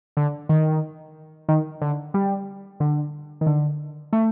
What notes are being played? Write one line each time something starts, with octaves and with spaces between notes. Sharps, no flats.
D3
D#3
D#3
D3
G3
D3
D#3
D3
A3